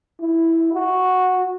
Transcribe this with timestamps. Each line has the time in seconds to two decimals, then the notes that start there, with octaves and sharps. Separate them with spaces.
0.20 E4
0.73 F#4